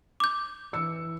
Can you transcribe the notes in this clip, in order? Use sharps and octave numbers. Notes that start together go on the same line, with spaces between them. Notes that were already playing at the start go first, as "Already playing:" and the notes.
D6 G6
E3 E6 C#7